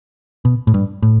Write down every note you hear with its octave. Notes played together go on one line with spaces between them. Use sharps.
B2
A2
G2
A2